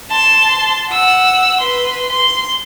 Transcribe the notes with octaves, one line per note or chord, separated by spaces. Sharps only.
A5 C6
F#5 E6
B4 C6
C6